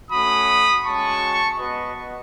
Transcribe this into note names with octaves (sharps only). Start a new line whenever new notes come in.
A3 C#4 F#4 B5 D#6
G#3 C#4 F#4 A5 C#6
B3 F#4 B4 D#5